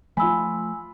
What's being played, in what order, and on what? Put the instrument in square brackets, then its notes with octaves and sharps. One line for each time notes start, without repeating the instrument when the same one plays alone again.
[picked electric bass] F3 A3 [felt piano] F4 B5 [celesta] G#5 E6